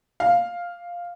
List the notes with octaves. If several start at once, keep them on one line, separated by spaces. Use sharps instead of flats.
F5